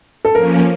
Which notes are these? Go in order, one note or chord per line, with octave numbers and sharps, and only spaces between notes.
A4
F3 A#3 C#4 A#4